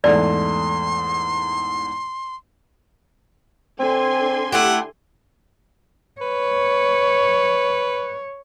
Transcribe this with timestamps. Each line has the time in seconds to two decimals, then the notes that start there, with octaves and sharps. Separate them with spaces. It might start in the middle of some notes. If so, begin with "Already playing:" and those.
0.04 E2 G#2 A3 D5 C6
3.80 D3 C4 G#5 C6
4.52 A3 E4 G4 F#5
6.21 B4 C#5